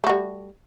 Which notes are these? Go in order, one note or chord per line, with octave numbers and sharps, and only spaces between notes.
G3 A3 F#4